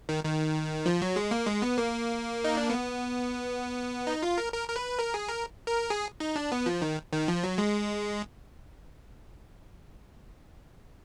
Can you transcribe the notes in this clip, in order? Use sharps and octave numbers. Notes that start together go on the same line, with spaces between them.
D#3
D#3
F3
F#3
G#3
A#3
G#3
B3
A#3
D#4
D4
B3
D#4
F4
A#4
A#4
A#4
B4
A#4
G#4
A#4
A#4
G#4
D#4
D4
B3
F3
D#3
D#3
F3
F#3
G#3